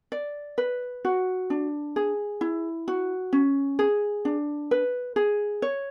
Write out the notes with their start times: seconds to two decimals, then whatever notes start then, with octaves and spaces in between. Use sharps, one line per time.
0.12 D5
0.58 B4
1.05 F#4
1.50 D4
1.96 G#4
2.41 E4
2.88 F#4
3.33 C#4
3.79 G#4
4.25 D4
4.71 B4
5.16 G#4
5.62 C#5